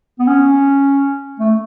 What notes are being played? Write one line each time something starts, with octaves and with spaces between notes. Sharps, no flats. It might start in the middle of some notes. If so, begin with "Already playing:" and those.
B3
C#4
A3